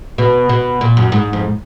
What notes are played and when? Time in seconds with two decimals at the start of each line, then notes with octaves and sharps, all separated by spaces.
0.18 B2
0.49 B2
0.81 A#2
0.97 F#2
1.12 G#2
1.33 F2